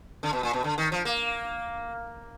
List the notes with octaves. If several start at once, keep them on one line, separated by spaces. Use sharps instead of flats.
D3
B2
A#2
B2
D3
D#3
F3
A#3